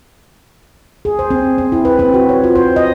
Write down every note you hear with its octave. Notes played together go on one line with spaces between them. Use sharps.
G#4
C5
C4
C4
E4
B4
C4
F#4
C#5
F4
C5
D#5